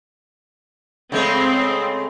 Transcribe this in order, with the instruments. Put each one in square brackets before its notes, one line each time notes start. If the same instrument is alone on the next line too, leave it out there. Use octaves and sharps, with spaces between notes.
[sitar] C#3 G#3 A3 [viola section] C4